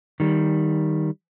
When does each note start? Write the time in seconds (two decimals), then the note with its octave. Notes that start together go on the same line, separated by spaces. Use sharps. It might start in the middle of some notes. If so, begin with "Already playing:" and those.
0.20 D#3 G3